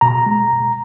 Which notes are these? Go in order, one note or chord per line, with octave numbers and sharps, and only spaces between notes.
B2 A#5
G#3
B2